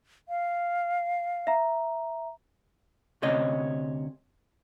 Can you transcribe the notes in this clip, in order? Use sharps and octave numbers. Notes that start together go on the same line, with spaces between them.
F5
E5 A#5
D2 C3 C#4 D#5